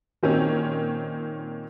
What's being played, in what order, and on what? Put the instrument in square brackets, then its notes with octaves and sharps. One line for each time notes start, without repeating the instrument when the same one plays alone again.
[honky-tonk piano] A#2 D#3 C4 C#4